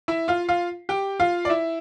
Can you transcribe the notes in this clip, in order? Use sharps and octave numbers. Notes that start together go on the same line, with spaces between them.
E4 E5
F4 F5
F4 F5
G4 G5
F4 F5
D5
E4 E5